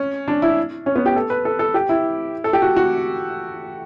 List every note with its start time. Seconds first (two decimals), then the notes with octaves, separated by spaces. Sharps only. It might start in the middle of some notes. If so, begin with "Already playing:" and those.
Already playing: C#4
0.28 D4
0.42 E4
0.86 C#4
0.96 B3
1.06 G4
1.16 A4
1.30 B4
1.45 A4
1.59 A4
1.74 G4
1.89 E4
2.44 A4
2.53 G4
2.62 F#4
2.76 F#4